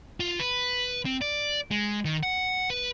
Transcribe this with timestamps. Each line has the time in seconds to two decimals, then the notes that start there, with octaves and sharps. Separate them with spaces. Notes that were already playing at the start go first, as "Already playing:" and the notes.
0.20 F4
0.40 B4
1.05 C4
1.21 D5
1.71 G#3
2.05 D#3
2.23 F#5
2.70 B4